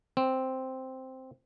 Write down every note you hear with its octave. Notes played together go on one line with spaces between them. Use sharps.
C4